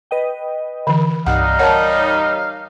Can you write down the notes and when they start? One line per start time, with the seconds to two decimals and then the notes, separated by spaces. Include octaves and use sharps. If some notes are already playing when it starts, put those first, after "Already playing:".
0.11 B4 D#5 G5
0.87 D3 E3
1.26 C2 G2 G3 D#4 F5 F#5 F#6
1.59 A#4 C#5 F#5 A5